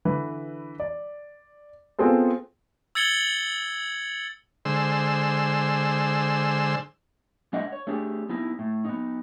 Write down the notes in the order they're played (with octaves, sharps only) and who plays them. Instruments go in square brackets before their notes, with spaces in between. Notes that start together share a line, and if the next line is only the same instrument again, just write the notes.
[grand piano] D3 E3 B4
D5
B3 C4 F4 G#4 A4 C5
[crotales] E6 G#6 A6 C#7 F#7 G7
[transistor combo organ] D3 G#3 C5 E6
[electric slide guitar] G#3 D4 D#5 E5 F#5
C#5
A3 D4 G4 G#4
B3 D#4 E4
A2
B3 D#4